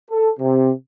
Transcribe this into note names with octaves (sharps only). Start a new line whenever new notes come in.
A4
C3